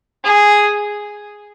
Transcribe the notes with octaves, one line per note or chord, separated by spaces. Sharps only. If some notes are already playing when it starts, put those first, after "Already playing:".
G#4